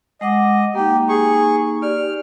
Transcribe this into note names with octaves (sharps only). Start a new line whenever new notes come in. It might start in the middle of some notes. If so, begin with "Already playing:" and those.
G#3 D#5 F#5 D6
A#3 D#4 G4
G#4 C#6
G4 D5 F6